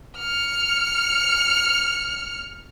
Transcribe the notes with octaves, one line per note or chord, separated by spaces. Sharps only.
F6 C#7